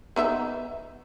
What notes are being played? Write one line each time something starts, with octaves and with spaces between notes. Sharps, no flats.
B3 D#4 E5